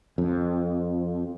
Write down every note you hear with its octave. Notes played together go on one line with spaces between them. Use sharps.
F2